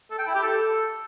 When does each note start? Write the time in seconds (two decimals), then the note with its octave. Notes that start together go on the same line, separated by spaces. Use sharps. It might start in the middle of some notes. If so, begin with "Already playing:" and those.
0.11 A4
0.19 G5
0.27 E4
0.35 G4
0.43 A4